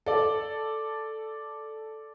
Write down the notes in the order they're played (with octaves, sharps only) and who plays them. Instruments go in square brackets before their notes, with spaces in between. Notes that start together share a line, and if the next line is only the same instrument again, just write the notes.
[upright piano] A4 D5